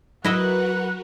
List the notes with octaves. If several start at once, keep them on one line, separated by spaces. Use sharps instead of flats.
F#3 E4 F#4 A#4 B4 D#5 E5 F#5